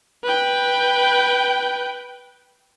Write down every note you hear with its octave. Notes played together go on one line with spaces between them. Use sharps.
B4 G5